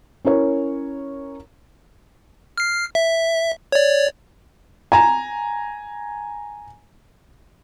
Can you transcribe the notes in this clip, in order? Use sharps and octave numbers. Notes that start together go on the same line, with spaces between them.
C#4 E4 A#4 C#5
F6 C7
E5
C#5 D5
G#5 A#5